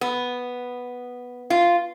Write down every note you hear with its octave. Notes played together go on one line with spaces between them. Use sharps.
B3
F4